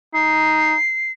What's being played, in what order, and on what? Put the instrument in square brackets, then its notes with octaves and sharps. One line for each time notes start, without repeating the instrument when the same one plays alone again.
[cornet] D#4 [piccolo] C7